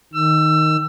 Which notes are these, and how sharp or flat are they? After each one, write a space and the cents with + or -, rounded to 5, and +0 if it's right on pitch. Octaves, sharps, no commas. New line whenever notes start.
D#3 +0 E6 +25